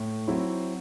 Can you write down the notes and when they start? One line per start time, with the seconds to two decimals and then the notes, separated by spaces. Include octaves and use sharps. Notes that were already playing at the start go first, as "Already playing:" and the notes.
Already playing: A2
0.28 F#3 C4 E4